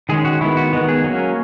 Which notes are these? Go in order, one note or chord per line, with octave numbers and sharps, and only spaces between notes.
D#3 G#3 C#4 G#4
F#4
D#3 G#3 B3 E4
F#4
D#3 G#3 B3
G#4
F#3 A#3 C#4